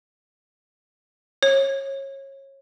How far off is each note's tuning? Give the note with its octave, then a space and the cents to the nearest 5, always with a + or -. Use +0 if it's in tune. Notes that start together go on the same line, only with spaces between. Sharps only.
C#5 -25